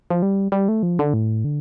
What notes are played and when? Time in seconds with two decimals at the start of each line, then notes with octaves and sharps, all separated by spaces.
0.10 F3
0.22 G3
0.52 G3
0.69 A3
0.83 F3
0.99 D3
1.14 A2
1.45 D3